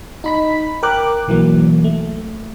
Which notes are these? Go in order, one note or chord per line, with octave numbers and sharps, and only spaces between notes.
D#4 B5 B6
A#4 G5 D6 F#6
B1 E3 F#3 A#3
A3